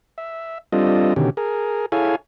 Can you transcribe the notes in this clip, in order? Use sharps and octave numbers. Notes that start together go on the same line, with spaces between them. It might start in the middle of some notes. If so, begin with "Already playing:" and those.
E5
G3 C4 D4 F4 A4 D#5
B2 D3 D#3 C#4 G4
G#4 A#4
E4 G#4 A4 C#5 F5 G#5